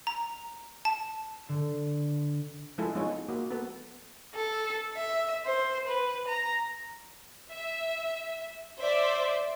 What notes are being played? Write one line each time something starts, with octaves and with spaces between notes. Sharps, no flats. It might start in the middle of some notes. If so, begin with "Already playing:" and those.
A#5
A5
D3
F3 G#3 A3 E4 G#4 A4
F3 G#3 B3 D#4 G#4 C#5
A#3 F#4
B3 A4 B4
A4
E5
C5
B4
A#5
E5
C5 D5 E5